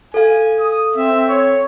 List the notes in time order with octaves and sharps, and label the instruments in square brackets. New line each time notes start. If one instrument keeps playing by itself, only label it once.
[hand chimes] A4 F5 [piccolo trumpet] G#5
[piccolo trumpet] D#6
[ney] C4 [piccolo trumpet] E5
[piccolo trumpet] C#5